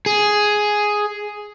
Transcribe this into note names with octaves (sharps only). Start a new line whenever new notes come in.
G#4